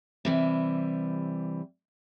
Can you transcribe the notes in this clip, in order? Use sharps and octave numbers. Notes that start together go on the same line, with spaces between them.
C3 E3 G3